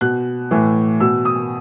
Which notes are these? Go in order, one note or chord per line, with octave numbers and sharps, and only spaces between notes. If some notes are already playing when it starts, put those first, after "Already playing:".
B2 F#6
A2 E3
B2 E6
D#6